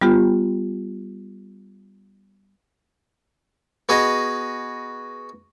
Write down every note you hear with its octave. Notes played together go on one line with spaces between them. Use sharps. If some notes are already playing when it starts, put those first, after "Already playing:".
G3 B3 F4 G4
B3 F#4 G#4 D#5